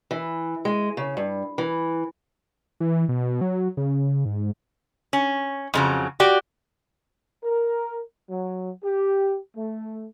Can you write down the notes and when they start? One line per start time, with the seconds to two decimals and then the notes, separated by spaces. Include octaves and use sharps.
0.11 E3
0.65 G#3
0.97 C#3
1.17 G2
1.58 E3
2.80 E3
3.09 B2
3.41 F#3
3.77 C#3
4.25 G#2
5.13 C#4
5.74 F2 C#3 F#3
6.20 F#4 G4 D5
7.44 A#4
8.30 F#3
8.84 G4
9.56 A3